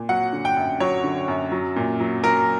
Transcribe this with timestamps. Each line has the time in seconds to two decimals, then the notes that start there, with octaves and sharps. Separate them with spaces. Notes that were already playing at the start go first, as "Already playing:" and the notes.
Already playing: A#2
0.09 F#3 F#5
0.33 D3
0.45 G5
0.57 F#2
0.80 F#3 C#5
1.04 D3
1.28 F#2
1.52 F#3
1.76 A#2
2.00 F#3
2.23 F#3 A#4